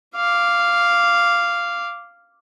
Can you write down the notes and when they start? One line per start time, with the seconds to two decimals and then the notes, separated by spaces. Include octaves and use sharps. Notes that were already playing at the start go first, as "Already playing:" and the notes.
0.15 F5 D6